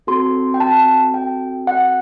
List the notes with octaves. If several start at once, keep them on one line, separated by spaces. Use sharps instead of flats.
C4 F#4 A4 C6
G5
A5
G5
F#5